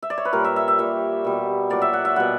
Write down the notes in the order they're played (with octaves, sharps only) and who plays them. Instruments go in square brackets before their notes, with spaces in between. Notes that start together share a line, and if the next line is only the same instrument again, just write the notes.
[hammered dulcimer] E5
D5
C#5
B4
A#2 G3 A#4
E5
E5
E5
A#2 G3 E5
B2 G3
A#2 F#3 D5
E5
F#5
E5
B2 G3 F#5